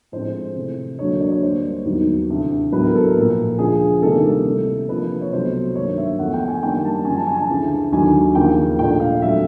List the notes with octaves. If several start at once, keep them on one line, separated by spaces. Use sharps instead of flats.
A2 F3 G#3 C4 C5
C3 E3 A3
D2 D3 F#3 A#3 C#5
D5
C#5
D2 D3 G3 A#3 C5
D#2 D#3 F#3 B3
D2 C3 E3
A2 F#3 B3 B4
A#4
A4
A#4
A#2 F3 A#3
D2 C#3 F3 G#4
C3 D#3 G3 A#3 D4 A4
C3 E3 A3
C3 F3 A#3 D4 B4
C#5
C2 B2 F#3 A3 C4 C5
G2 D#3 F#3 A#3 C#5
E5
E2 C#3 F3 A3 F#5
G5
G#5
F#2 D#3 G3 A#3 D4 G5
A5
F#2 C#3 F3 G#5
A5
G#5
A5
D2 C#3 E3
D#2 D3 F#3 G#5
D#2 C#3 F3 A#3 G5
A#2 F3 A3 D4 G5
F5
F2 D3 F#3 A3 E5